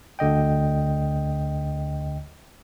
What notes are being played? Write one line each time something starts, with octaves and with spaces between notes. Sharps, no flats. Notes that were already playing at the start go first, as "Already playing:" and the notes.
D2 D3 D#5 G5